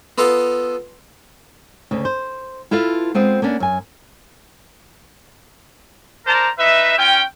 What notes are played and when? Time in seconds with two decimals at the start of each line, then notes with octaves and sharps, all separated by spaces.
0.18 B3 F4 A4 D#5 F5
1.91 D2 C#3
2.05 C5
2.71 E4 F4 A4 B4 E5 F5
3.15 G#3 B3 C4 F4
3.42 A#3 B3 C#4 D4
3.60 F#2 G#5
6.26 A#4 C5 D5 A5 A#5
6.58 D#4 B4 E5
6.98 C#4 F4 G5